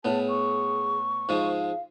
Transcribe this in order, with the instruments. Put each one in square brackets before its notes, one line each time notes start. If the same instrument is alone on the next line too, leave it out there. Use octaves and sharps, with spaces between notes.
[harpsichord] A2 B3 [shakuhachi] G#4 [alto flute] A5
[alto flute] C#6
[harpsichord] G#2 F3 G#3 [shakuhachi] F5